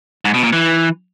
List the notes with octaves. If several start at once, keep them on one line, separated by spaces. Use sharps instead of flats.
G#2
B2
A#2
E3